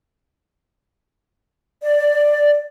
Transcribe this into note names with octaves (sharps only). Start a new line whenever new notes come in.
D5